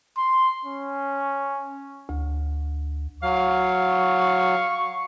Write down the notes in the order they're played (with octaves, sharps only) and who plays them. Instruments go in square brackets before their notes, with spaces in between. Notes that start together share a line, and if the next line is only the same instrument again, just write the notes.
[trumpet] C6
C#4
[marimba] D2
[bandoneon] F#3 [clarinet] F5 [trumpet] C#6